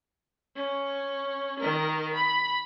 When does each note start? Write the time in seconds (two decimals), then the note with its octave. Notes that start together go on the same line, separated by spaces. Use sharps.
0.56 C#4
1.59 D#3 A#4
2.14 B5